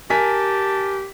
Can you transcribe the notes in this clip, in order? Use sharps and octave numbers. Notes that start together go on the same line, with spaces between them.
G4 A#4 G#5 A5 B6